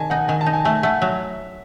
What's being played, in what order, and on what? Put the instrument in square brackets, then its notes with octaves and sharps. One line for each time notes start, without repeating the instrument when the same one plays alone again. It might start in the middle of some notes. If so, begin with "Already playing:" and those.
Already playing: [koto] D#3 [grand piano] G#5 A5
[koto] D#4 [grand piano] F#5
[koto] D#3 [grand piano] G#5
[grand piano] A5
[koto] D#4
[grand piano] G#5
[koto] A3 [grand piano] G#5
[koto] A3 [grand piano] F#5
[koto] F#3 [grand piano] E5